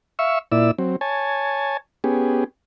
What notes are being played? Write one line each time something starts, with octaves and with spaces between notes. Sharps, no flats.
E5 F5 C#6 E6
A#2 E4 D5 E6
F#3 C4
C#5 G#5 A5
B3 C#4 G4 G#4